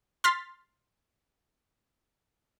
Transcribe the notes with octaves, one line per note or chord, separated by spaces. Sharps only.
C6 F6 A6 B6